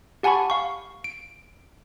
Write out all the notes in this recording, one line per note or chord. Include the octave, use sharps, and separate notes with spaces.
G4 F#5 G#5 A5 B5 C#6
F5 C#6
D7